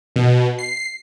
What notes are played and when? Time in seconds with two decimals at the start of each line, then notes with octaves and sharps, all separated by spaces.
0.16 B2
0.59 C7